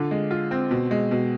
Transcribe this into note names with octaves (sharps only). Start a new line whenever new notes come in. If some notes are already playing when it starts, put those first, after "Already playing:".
Already playing: D3 F4
G#3
F4
C4
B2
G#3
B2